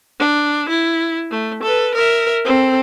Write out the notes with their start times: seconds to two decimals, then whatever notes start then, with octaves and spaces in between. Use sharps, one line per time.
0.20 D4
0.69 E4
1.31 A3
1.63 A4 B4
1.95 A#4 E5
2.45 C4 A4